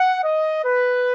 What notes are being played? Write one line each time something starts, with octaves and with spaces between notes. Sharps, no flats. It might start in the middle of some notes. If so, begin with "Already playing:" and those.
Already playing: F#5
D#5
B4